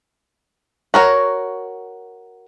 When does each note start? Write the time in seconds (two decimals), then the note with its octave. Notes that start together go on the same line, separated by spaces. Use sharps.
0.94 F#4 A#4 C#5